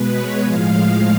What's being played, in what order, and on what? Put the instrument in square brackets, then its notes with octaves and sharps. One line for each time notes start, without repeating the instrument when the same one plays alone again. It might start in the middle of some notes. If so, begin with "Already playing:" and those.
Already playing: [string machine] B2 G#3 B4
C#5
A2 F3 G#3 F5